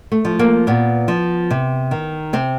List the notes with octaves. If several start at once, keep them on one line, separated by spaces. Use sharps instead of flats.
A3
F3
A#3
A#2 B3
F3
C3
D#3
C3 C4